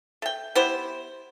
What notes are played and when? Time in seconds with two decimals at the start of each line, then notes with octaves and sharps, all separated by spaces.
0.22 A3 G5
0.55 B3 E4 G4 C5